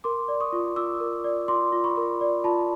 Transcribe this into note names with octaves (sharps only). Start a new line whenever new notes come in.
A#4 C6 D6
D5
C#6 D#6
F4
F4 D6 E6
A#4
D5
F4 C6 D6
F4
B5 C#6
A#4
D5
F4 A5 B5